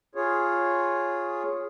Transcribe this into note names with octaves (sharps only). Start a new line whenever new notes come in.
F4 G#4 C#5